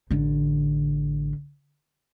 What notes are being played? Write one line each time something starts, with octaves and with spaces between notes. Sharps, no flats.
A1 D3